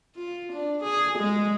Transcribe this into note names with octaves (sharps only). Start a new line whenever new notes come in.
F4
D4
G#4
G#3